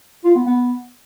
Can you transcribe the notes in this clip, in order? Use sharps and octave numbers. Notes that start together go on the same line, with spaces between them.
F4
B3
B3